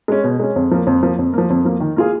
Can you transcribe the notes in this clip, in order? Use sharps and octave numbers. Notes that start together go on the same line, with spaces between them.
G#3 C#4
B2
G#3 C#4
F2
F3 A#3
F2
F3 A#3
F2
F3 A#3
F2
F3 A#3
D#3
A#3 F4 G#4